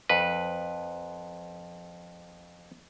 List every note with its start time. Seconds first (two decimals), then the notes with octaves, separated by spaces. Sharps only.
0.10 F2 B4